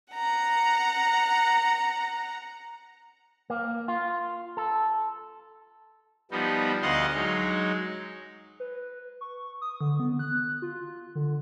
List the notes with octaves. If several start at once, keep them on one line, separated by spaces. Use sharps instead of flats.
F#5 A#5
A#3
F4
A4
F3 G3 B3 D#4
D2 D#5 F5 F#5 C6
F#3 G#3 D#4
B4
C#6
D#6
D3
B3
F#6
F4
D3